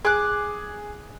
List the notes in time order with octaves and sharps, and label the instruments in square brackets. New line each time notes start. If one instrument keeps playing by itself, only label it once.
[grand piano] G#4 [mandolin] D6 F#6